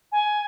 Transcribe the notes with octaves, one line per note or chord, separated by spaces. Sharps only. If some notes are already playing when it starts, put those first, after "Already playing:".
G#5